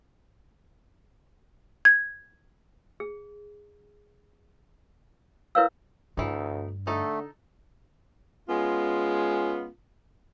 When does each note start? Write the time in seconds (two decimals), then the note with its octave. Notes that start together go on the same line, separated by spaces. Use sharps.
1.85 G#6
3.00 G#4
5.55 E4 A#4 B4 C#5 F5 E6
6.17 D2 G2 E3 D#4
6.87 D3 A3 D#4 A4
8.48 G#3 B3 C#4 F4